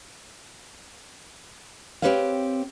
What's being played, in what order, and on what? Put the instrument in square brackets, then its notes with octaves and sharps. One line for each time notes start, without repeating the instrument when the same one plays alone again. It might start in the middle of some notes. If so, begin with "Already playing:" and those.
[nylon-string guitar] C4 E4 G4 B4 C#5 F5